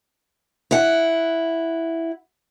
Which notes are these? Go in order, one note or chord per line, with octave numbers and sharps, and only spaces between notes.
E4 F#5